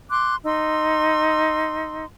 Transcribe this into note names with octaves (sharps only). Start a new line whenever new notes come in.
C6 D6 F#6
D#4 C6 E6